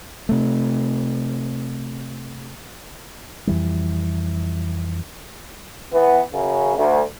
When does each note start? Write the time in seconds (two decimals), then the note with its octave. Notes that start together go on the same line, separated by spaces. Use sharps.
0.29 C3 A3
3.47 F2 E3 G3
5.92 E3 B3
6.32 F#2 C#3
6.76 D2